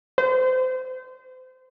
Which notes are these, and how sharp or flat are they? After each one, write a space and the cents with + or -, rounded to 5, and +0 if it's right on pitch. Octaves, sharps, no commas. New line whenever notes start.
C5 -30